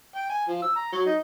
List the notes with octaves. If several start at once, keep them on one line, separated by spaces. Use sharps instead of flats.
G5
G#5
F3
E6
A#5
F#3
D#4